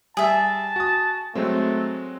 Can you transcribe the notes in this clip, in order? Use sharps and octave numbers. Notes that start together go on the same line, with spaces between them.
G3 G#4 E5 A5
F#4 D#6
F#3 G#3 A3 C4